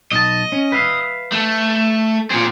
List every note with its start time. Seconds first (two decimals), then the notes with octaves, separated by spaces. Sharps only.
0.12 B1 D#5 A5
0.52 C#4
0.72 B4 E5 F5
1.32 A3
2.30 A#2 C4 F4 G#4